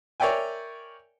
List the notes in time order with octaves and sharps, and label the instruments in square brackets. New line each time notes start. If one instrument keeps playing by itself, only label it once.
[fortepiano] A#4 C#5 D5 E5 G5 G#5